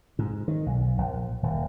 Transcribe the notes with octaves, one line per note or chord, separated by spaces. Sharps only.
G#2
D#3
B1
A#1
D#1